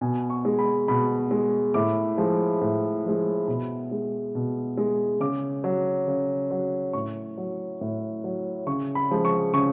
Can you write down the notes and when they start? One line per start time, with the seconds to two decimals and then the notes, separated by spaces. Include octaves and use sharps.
0.01 B2 G#5
0.30 C#6
0.45 G#3
0.59 B5
0.88 B2 B5
1.31 G#3
1.74 A2 D6
2.18 F3 G#3
2.61 A2
3.05 F3 G#3
3.48 B2 B5
3.91 G#3
4.35 B2
4.77 G#3
5.20 C#3 D6
5.64 F#3
6.08 C#3
6.51 F#3
6.93 A2 C#6
7.37 F#3
7.81 A2
8.24 F#3
8.67 C#3 C#6
8.95 B5
9.11 F3 G#3
9.25 C#6
9.54 C#3 C#6